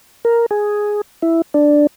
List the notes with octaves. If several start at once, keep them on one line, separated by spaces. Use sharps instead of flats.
A#4
G#4
E4
D4